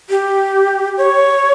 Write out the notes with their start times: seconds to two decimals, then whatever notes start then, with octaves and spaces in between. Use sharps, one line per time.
0.10 G4
0.98 C#5